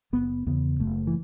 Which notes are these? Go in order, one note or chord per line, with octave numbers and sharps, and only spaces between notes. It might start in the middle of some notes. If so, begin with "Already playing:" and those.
F#1 B3
E2 C#3 B3
F#1 A3
E3